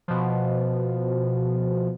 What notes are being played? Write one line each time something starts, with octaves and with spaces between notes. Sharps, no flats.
B2 F3